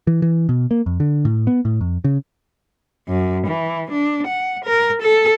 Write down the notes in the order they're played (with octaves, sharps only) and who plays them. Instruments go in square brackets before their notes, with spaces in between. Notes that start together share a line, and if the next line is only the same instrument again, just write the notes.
[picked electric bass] E3
E3
B2
A#3
F2
D3
A2
B3
A2
F2
C#3
[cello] F#2
E3
D4
F#5
A#4
A4